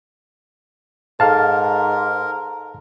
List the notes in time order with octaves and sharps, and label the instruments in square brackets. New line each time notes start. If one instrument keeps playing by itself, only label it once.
[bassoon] G#2 [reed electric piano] A4 F5 A5 [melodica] A#4